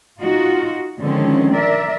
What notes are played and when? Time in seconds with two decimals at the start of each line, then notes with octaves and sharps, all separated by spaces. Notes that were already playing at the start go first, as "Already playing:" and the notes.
0.19 D#4 F4 F#4
1.02 D3 D#3 F3 G#3 C4 C#4
1.55 A#4 D5 E5